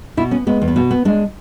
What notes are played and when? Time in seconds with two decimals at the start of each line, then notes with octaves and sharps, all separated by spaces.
0.17 B2 E4
0.31 B3 C#4
0.47 G#3 B3
0.62 E2
0.68 B3
0.76 B2
0.91 B3
1.05 G#3 D4